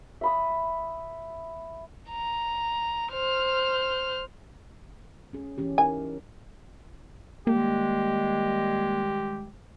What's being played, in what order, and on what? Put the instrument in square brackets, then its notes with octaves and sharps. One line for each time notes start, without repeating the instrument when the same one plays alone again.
[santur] E5 B5 D#6
[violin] A#5
C5 F6
[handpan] C#4 G#4
E3 C#4 G4
[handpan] D#4 E4 A#4 [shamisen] G#5
[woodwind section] D#3 G3 G#3 [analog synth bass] A#3 [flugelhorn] G4